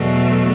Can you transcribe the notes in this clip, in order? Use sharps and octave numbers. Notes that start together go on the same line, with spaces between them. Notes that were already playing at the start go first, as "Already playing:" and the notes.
Already playing: E2 B2 F#3 A3